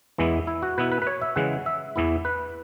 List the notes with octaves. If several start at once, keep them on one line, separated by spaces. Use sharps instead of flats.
E2 E3 G#3 B3 E4
E4
F#4
B2 B3 E4 B4
B4
B4
C#5
E5
C#3 E3 G#3 F#5
E5
E2 E3 B3 E4
B4